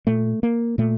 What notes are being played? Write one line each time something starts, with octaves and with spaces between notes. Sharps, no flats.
A#2 A3
A#3
A#2 A3